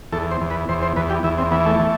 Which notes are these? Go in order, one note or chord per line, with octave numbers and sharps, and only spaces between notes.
E2 A4
C5
E2
B4
E2 C5
C5
E2 B4
G4
E2 E4
C4
E3 B3
A3
E3